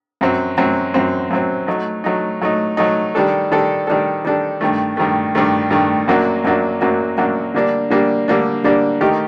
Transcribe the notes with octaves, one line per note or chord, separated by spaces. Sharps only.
F#2 F#3 C4
F#2 F#3 C4
F#2 F#3 C4
F#2 F#3 C4
F#3 A3 D#4
F#3 A3 D#4
F#3 A3 D#4
F#3 A3 D#4
D#3 G3 D4 A4
D#3 G3 D4 A4
D#3 G3 D4 A4
D#3 G3 D4 A4
G2 D#3 A3
G2 D#3 A3
G2 D#3 A3
G2 D#3 A3
F#2 F#3 A#3 D4 F#4
F#2 F#3 A#3 D4 F#4
F#2 F#3 A#3 D4 F#4
F#2 F#3 A#3 D4 F#4
D3 G3 A#3 D4
D3 G3 A#3 D4
D3 G3 A#3 D4
D3 G3 A#3 D4
D#3 A3 D#4 G4 A#4